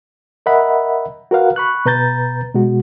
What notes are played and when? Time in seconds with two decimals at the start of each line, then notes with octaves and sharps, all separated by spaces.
0.46 A#4 D#5 E5 F#5 B5
1.31 F#4 A#4 B4 F5 F#5
1.56 B5 C#6 F#6
1.85 B2 B4 A#5 G6 A6
2.54 B2 G#3 F#4